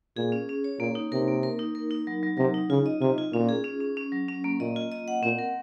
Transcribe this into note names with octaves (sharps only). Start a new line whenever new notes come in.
A#2 G#4
C#4
C#4
C#5
A#2 A#3
D#4
C3 A#4
A#3
A#4
D#4
A#4
D#4
F#3
F#3
C3 F#3
D#4
C#3 F4
D#5
C3 F4
F4
A#2 C#4
G#4
C#4
C#4
C#4
F#3
C#4
A#3
A#2 D#5
F4
D#5
F#5
A#2 C4
A#4